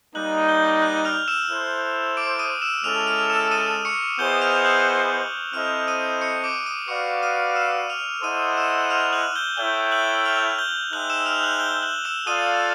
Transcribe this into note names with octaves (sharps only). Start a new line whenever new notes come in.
G3 A#3 D#4 F#6 F#7
G6 G7
F#6 F#7
F6 F7
E6 E7
E4 A4 C5
D6 D7
D#6 D#7
E6 E7
G#3 C#4 E4 A4 F6 F7
F6 F7
E6 E7
E7
D#6 D#7
C#6 C#7
B3 E4 G#4 C5 D#5 G6 G7
F6 F7
F#6 F#7
C4 E4 A4 C5 D#5 F6 F7
D#6 D#7
C#6 C#7
D6 D7
D#6 D#7
F#4 B4 D5 F5 C#6 C#7
D#6 D#7
E6 E7
F6 F7
E4 A4 C5 D#5 F#5 D#6 D#7
E6 E7
F6 F7
F#6 F#7
G6 G7
E4 A4 C#5 E5 G5 G6 G7
F#6 F#7
F#7
F6 F7
G6 G7
D#4 G#4 C5 E5 G5 F#6 F#7
E6 E7
F6 F7
F#6 F#7
G6 G7
F#6 F#7
E6 E7
F4 A4 D5 F5 D#6 D#7